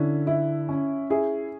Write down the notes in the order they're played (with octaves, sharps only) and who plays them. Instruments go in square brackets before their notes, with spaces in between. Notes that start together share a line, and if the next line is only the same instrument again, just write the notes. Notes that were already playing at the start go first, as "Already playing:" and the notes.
Already playing: [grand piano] D3 C#4 [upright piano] E4
[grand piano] E4
C#4
[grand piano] E4 [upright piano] G#4